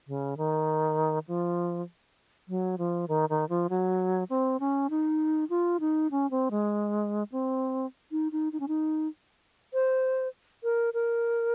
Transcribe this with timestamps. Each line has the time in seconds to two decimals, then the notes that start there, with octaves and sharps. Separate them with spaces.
0.07 C#3
0.37 D#3
1.28 F3
2.48 F#3
2.78 F3
3.08 D#3
3.29 D#3
3.49 F3
3.69 F#3
4.30 C4
4.60 C#4
4.90 D#4
5.50 F4
5.80 D#4
6.11 C#4
6.31 C4
6.51 G#3
7.32 C4
8.12 D#4
8.32 D#4
8.53 D#4
8.60 C#4
8.68 D#4
9.74 C5
10.64 A#4
10.94 A#4